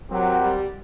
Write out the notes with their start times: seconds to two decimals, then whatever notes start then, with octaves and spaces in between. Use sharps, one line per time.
0.11 F#3 C4 G4 A#4 F#5
0.40 G3